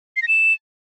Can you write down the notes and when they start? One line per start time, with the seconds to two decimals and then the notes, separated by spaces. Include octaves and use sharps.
0.17 C7
0.22 A#6
0.28 E7